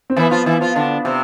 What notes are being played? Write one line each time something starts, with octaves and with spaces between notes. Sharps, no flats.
C4
E3 B3 E4
F3 F4
E3 E4
F3 F4
D3 D4
C3 C4